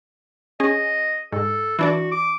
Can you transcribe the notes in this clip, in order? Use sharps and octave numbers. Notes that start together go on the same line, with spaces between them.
C#4 G#4 D#5
G#2 A4
E3 D4 F#4 D5
D6